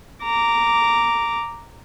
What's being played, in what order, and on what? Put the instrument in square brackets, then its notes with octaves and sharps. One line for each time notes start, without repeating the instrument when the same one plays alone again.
[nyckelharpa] A#5 D6